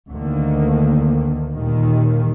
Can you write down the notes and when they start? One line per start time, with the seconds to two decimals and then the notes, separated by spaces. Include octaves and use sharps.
0.11 D2 D3 D#3 A#3
1.52 D#2 A#2 D#3 G3